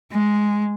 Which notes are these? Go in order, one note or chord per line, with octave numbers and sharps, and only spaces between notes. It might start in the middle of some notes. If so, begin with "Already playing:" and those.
G#3